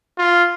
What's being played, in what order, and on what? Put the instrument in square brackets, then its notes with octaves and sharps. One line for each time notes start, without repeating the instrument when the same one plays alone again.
[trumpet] F4